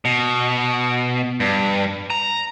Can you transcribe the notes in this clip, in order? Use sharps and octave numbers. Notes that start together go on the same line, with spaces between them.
B2
G2
A#5